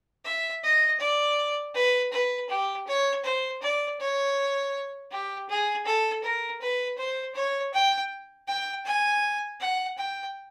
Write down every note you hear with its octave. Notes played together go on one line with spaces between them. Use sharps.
E5
D#5
D5
B4
B4
G4
C#5
C5
D5
C#5
G4
G#4
A4
A#4
B4
C5
C#5
G5
G5
G#5
F#5
G5